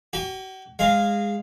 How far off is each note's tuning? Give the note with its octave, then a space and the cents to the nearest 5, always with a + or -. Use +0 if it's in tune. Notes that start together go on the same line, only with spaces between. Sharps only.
F#4 +45 G5 +45
G#3 -15 F5 +0